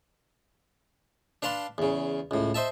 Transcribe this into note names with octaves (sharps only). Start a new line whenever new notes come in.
D4 B4 F5 A5 C6
E2 C#3
C#2 A2
C5 D#5 E5 A5